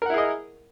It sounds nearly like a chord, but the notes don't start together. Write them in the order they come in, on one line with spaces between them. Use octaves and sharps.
A#4 F#5 E4 G#4 D#5